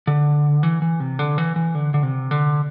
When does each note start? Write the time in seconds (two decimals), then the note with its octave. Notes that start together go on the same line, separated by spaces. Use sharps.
0.07 D3
0.63 E3
0.82 E3
1.00 C3
1.19 D3
1.38 E3
1.56 E3
1.75 D3
1.94 D3
2.03 C3
2.31 D3